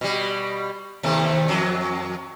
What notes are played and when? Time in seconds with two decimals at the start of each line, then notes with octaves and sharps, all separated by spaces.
0.01 B2 G3
1.03 D#2 C3 A3
1.48 F2 F#3